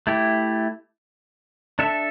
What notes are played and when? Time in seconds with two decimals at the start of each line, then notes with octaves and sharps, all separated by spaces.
0.07 A3 E4 G4
1.79 D4 A4 E5